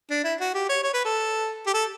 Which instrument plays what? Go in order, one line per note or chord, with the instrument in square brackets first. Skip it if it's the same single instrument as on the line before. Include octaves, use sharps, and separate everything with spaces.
[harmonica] D4
E4
F#4
G4
C#5
C#5
B4
A4
G4
A4